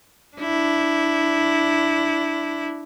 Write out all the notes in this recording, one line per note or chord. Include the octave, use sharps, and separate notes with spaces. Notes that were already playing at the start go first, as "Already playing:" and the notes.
D4 E4